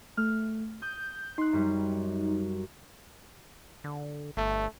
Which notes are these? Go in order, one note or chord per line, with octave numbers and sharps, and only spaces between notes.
A3 F6
D#6 G6
D#4 C6 F#6
F#2 G3
D3
G1 A3